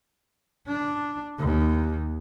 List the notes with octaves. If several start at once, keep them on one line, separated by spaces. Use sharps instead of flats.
D4
D#2